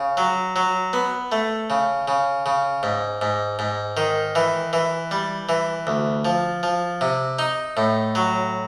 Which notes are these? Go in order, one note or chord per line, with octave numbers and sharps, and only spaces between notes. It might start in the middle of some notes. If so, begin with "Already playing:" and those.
Already playing: C#3
F#3
F#3
B3
A3
C#3
C#3
C#3
G#2
G#2
G#2
D#3
E3
E3
G3
E3
D2
F3
F3
C3
D#4
A2
F#3